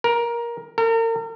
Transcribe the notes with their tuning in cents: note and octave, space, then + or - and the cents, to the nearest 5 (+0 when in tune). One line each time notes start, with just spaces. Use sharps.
A#4 +15
A#4 -40